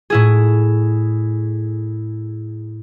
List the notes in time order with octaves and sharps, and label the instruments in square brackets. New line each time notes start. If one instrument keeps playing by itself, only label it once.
[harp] A2 E4 G#4